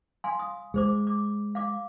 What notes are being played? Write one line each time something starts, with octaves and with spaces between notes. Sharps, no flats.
F5 G#5 C6
D#6
G#3 G#4 C5 D6
D6
F5 D6